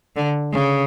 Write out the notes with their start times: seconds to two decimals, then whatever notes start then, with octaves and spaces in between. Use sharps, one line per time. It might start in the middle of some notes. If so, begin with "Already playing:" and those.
0.16 D3
0.52 C#3